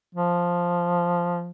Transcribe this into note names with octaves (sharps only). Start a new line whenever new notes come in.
F3